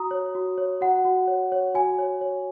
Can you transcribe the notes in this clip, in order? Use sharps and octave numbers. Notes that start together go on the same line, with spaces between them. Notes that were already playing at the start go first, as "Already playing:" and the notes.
Already playing: F#4 A#5 D#6
C#5
F#4
C#5
F#4 F#5
F#4
C#5
C#5
F#4 G#5
C#5
C#5